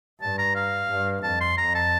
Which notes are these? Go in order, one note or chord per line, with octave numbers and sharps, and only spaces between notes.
G2 A5
A#5
F5
G2
F2 A5
C6
F2 A#5
A5